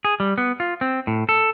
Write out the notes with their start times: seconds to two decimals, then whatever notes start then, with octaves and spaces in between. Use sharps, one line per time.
0.05 G#4
0.20 G3
0.38 B3
0.60 F4
0.81 C4
1.07 A2
1.29 A4